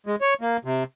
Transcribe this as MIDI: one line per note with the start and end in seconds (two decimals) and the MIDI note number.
0.07 0.16 56
0.21 0.34 73
0.41 0.57 58
0.65 0.84 48